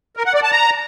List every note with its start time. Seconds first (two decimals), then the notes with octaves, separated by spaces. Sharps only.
0.17 A#4
0.26 F#5
0.34 D5
0.43 A5
0.52 A#5